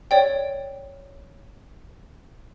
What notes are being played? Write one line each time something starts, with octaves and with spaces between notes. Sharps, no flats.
C#5 D5 G5